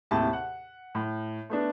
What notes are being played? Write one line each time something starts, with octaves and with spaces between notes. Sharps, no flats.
D#2 A2 C3 E5 A5
F#5
A2
A3 B3 D4